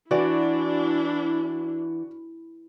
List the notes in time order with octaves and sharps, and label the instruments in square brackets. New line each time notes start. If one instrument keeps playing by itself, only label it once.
[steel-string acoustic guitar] E3 [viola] D4 E4 [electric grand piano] F#4 D5